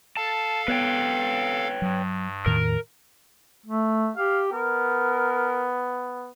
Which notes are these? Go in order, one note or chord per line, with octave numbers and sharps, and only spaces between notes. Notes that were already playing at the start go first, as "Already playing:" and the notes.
A4 F5 A5
B3 B4 C#5 G5
G2 F#3
E2 A2 D#3 A#4
A3
G4 F5
B3 A#4